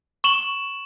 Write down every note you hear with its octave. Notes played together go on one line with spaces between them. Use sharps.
C#6 E7 F#7